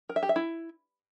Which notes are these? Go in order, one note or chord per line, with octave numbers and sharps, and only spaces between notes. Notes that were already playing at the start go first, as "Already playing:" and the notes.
A#4
E5
G4
E5
E4